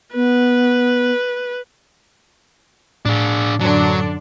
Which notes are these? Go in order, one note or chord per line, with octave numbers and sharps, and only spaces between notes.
B3 B4
A2 D4 G#4
F#2 D3 F#3 D4